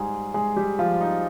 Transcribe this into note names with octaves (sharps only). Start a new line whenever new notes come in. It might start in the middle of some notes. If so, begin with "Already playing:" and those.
Already playing: G#2 G3 G#3 G#4
G#3 G#4
G3 G4
F3 F4
D#4